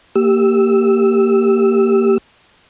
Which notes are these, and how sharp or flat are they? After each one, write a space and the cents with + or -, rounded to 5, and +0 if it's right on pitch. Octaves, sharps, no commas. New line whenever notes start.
A#3 -15 G4 +0 E6 -5